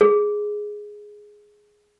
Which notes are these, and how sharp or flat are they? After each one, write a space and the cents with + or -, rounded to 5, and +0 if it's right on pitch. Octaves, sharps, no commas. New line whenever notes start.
G#4 +5